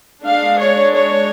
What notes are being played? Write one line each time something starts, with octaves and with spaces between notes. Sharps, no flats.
G#3 D4 F5
C#5
C#5